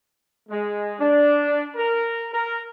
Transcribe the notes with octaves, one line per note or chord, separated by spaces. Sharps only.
G#3
D4
A#4
A#4